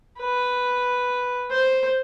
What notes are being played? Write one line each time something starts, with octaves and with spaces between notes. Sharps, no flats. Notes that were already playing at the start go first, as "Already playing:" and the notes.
B4
C5